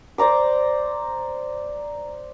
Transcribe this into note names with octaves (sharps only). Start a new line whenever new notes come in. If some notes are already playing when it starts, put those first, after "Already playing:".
C5 D5 A#5 D6